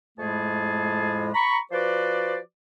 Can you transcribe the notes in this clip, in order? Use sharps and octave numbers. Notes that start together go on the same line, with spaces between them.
F2 A2 G#3 A3 G#4 A5
A#5 B5 C#6
F3 F#4 B4 C5 D5